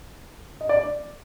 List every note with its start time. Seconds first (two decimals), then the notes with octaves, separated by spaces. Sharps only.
0.61 D#5
0.69 D5